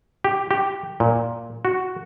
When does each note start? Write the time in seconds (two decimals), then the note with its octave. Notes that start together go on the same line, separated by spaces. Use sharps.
0.24 G4
0.51 G4
1.00 A#2
1.65 F#4